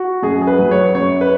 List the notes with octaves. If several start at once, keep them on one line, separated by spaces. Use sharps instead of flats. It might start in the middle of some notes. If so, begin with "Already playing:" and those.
Already playing: F#4
F#2 G#4
G#4
B4
F#3
C#5
F#2 C#5
B4